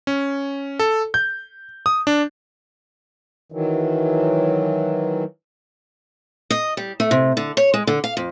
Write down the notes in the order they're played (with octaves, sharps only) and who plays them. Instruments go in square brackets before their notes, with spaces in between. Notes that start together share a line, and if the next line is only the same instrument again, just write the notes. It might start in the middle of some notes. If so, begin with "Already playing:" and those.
[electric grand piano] C#4
A4
G6
D#6
D4
[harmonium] D#3 E3 F#3
[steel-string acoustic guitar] D#5
G3
A3
C3
D3
C#5
G#3
D3
F5
F2